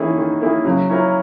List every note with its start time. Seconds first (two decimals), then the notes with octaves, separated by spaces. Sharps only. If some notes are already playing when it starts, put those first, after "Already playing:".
Already playing: D#3 E3 A#3 C#4 E4 G#4
0.17 D#3
0.41 A#3 C#4 E4 G#4
0.65 C#3 F#3
0.90 C#4 E4 A#4